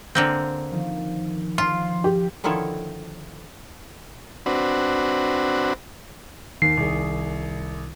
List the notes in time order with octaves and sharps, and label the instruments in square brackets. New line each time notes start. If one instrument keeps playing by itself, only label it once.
[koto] D3 A#3 C4
[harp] D#3 F3 D#4
[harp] F3 [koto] F4 [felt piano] C6
[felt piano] G4
[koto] D3 D#3 F3 E4 A4 C#5
[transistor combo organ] C4 D4 F#4 B4
[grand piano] D#2 [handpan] D#3 [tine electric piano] C7
[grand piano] C2 G#4